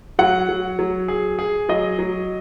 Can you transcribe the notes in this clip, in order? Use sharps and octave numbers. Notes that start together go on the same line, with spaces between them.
F#3 F#5
F#3
F#3
G#4
G#4
F#3 D#5
F#3